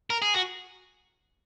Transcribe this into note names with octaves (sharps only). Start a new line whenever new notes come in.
A#4
G#4
F#4